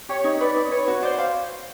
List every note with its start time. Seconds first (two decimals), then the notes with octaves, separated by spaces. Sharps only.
0.09 G4 C#5
0.24 D#4
0.40 B4 D5
0.56 D#4
0.71 B4 C#5
0.88 F#4
1.03 C5 D5
1.18 F5